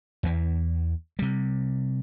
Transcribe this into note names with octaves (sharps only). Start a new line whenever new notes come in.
E2 E3
C3 G3